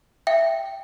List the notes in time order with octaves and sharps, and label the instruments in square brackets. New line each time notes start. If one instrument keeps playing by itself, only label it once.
[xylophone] E5 G5